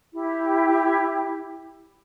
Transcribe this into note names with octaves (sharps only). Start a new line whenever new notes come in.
E4 G4